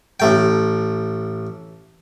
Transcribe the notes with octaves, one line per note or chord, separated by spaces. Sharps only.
A1 A3 G5